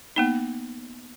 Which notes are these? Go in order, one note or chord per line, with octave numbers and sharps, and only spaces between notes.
A#3 B3 D#4